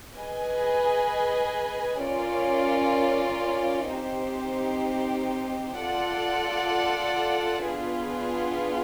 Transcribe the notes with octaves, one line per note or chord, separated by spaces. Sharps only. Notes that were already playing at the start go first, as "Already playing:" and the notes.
G#4 B4 D#5 G#5
C#4 F4 A#4 D5
C4 D#4 G4 C5
F4 A4 D5 F#5
B3 D4 F4 G#4 B4